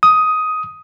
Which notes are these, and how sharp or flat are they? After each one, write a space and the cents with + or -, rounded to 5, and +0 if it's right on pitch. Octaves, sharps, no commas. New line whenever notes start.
D#6 +10